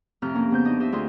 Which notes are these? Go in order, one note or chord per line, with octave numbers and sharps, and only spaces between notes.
F2 A2 C3 A#5 F6 F#6
A#3 C#4
C#3 B3 C5 G6
D4 D#4 D#5
G4 C5 D#5 E5
D2 F4 G#4 D#5 C6